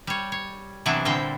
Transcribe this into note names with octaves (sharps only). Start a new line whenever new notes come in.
G3 C#5
C#5
C3 E3 F#3 B3 D4 E4
A#2 D3 G3 C4 C5 G5